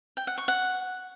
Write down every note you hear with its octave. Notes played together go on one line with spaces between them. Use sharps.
G5
F#5
C#6
F#5